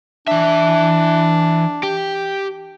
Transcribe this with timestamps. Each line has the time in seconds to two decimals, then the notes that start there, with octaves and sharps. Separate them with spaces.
0.28 E3 D4 E5
1.83 G4